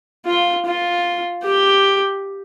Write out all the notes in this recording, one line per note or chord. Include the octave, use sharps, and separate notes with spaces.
F4
F4
G4